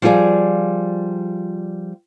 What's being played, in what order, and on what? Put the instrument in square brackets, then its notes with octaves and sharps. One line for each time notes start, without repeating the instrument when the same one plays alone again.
[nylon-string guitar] F3 G3 F4 G#4 D5